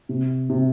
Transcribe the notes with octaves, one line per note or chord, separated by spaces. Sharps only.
C3
C3